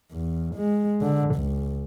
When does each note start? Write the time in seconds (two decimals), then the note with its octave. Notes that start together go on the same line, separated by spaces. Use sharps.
0.12 E2
0.56 G#3
1.02 D3
1.36 C#2